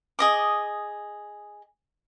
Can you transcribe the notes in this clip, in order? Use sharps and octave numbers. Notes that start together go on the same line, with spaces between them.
G#4 D#5 D6